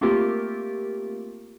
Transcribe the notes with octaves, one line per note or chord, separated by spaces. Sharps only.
A3 A#3 C4 F4 G4 A#4